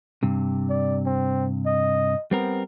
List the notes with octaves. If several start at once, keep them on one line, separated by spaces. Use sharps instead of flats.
G2 C3
D5
C4
D#5
G3 B3 C4 A#4